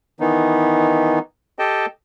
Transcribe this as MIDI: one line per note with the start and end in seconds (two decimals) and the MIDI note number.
0.20 1.19 51
0.20 1.19 52
0.20 1.19 59
0.20 1.19 63
1.59 1.86 67
1.59 1.86 69
1.59 1.86 75
1.59 1.86 79
1.59 1.86 81